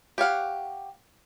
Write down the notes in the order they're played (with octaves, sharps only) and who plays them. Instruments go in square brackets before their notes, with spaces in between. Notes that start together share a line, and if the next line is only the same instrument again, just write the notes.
[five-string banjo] G4 C#5 F5 F#5